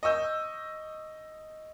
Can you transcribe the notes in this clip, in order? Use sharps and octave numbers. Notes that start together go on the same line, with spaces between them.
D#5 C#6 E6 G6